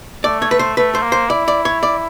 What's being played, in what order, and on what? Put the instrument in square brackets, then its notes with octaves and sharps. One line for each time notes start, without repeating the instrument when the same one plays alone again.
[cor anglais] A3 [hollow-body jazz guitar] D5
[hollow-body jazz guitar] C#5
B4
C5
[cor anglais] A3 [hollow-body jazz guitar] B4
[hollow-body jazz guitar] C5
[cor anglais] A#3
[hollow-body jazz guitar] C5
[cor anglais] E4 [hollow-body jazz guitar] D5
[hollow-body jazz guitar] D5
C#5
D5